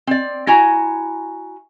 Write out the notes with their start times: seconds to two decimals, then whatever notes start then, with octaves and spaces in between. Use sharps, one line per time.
0.07 C4 D5
0.47 E4 F#4 G#5 A#5